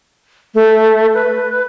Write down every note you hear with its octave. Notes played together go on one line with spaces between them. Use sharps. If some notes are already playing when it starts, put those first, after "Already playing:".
A3
B4